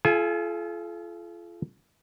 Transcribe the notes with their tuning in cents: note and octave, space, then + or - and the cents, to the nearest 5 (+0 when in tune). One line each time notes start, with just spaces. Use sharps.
F4 -30 A4 -45 G#5 +0